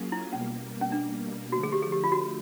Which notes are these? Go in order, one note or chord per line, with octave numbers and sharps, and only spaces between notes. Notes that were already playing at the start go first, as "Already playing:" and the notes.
Already playing: F#3 A#3 C#4 F4 G#4
E4
B2 G3 A#3 C#4
C#4
D4
D3 F3 A3 F#4
G#4
G4
G#4
G4
F4
F#4